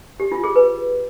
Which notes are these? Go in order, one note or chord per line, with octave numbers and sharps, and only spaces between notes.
G4
F4
G#4
B4